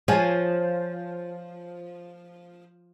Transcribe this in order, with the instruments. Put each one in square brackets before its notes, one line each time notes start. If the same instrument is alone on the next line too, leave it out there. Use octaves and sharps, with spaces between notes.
[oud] F3 [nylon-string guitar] C#5 F5 G#5